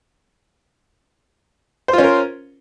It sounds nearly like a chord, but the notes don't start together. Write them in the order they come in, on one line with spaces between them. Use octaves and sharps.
C5 F4 C#4 A#4